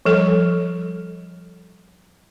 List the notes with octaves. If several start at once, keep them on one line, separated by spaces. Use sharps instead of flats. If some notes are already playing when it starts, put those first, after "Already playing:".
F3 G3 A4